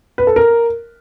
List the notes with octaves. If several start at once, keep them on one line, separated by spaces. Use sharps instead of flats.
B4
A4
A#4